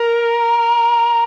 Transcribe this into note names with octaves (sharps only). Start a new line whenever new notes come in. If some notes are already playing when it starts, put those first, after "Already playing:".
Already playing: A#4